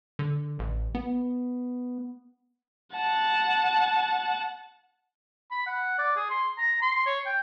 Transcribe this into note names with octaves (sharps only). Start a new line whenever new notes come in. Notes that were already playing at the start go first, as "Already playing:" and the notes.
D3
A1
B3
F#5 A5
B5
F#5
D5
G#4
C6
A#5
C6
C#5
G5